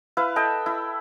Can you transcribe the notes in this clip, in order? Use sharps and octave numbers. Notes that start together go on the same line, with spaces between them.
E4 B4 F5
A4 D#5 E5 G5
E4